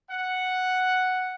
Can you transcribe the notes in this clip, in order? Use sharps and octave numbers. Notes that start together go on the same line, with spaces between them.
F#5